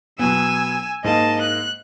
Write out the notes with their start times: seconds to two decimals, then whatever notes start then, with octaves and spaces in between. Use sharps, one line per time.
0.19 B2 F#3 B3 G#5 E6
1.04 G#2 A#3 D#5 A5
1.41 F#6